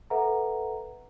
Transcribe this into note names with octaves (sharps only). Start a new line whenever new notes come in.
A4 B4 E5 F#5 A#5